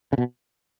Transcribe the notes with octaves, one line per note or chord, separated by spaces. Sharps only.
C#3
B2